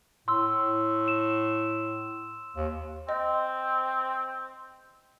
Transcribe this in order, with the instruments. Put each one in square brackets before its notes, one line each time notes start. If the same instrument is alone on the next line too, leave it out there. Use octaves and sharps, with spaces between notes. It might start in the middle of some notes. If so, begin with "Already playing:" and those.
[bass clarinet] A2 [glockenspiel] C6 E6
[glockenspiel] E7
[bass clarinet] D#2
[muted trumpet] C4 [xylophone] D#5